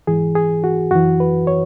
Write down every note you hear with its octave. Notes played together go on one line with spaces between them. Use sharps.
G#2 E3 G#4
G#4
F#4
F#2 E3 F#4
B4
C#5